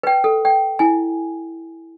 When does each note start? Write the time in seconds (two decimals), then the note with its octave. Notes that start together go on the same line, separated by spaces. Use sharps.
0.03 B4 G5
0.24 A4
0.45 G5
0.79 E4 G#5